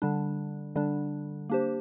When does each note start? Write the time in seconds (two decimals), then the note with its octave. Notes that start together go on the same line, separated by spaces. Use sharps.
0.02 D3 G3 D4
0.75 D3 G3 D4
1.49 A#3 D4 G4 C5